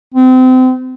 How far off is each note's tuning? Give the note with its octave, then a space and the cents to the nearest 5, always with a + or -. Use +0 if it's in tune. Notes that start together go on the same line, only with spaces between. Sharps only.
C4 -30